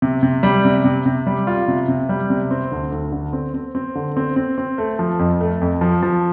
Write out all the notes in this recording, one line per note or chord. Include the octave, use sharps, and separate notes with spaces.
C3
C3
G3
C3
C3
C3
G3
F4
C3
C3
G3
C3
C4
D2
D2
D3
C4
C4
C4
D3
C4
C4
C4
A3
F3
F2
A3
F2
F3
F3